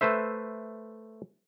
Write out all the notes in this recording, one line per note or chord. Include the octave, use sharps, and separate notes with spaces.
A3 B4 C5 E5